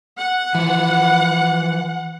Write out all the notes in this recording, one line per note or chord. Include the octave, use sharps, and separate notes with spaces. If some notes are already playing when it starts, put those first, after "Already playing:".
F#5
E3 F3